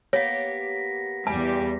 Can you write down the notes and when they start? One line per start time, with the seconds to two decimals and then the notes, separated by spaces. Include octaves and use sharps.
0.13 A#3 B3 G4 C#5 A#6 B6
1.27 E2 G3 G#5